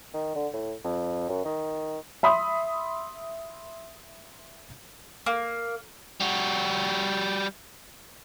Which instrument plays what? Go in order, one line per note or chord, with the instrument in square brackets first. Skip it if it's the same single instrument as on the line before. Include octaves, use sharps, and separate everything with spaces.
[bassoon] D#3
D3
A2
F2
F#2
D#3
[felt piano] E5 B5 C6 D#6
[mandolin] A#3
[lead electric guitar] G3 F#4